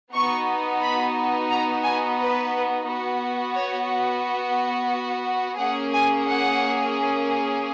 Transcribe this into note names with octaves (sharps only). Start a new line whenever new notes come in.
B3 D#4 F#4 C#6
B5
A#5
G#5
B4
B3 F#4
C#5
A#3 C#4 G#4 F#5
G#5
F#5